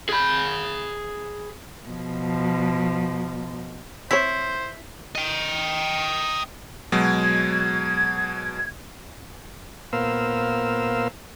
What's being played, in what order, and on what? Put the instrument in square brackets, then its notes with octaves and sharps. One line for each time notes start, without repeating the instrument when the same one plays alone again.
[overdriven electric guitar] G#4 B5
[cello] B2 F3
[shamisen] C4 C#5 [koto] E4 [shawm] C5 [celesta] B6
[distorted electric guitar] D#5 G5
[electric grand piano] B2 F#3 G#3 [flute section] G#6
[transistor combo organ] A#2 B3 A#4 C5 F5 E6